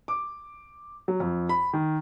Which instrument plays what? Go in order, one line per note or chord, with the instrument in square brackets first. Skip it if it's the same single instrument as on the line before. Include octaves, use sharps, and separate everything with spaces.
[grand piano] D6
F#3
F2
B5
D#3